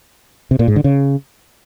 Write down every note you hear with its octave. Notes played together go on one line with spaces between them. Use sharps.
C3
A#2
G#2
D3
C#3